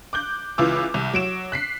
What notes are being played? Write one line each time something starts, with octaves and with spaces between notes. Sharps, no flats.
D6 F#6 G6
C#2 E3 F4 D6 E6
C2
F#3 D7 E7
F#6 B6 C7